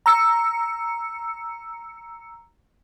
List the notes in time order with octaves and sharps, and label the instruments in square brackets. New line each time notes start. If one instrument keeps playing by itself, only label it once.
[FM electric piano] A#5 E6 C#7